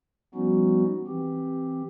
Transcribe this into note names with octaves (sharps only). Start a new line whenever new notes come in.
F3 G3 B3 C#4 D#4 F#4
E3 C4 G4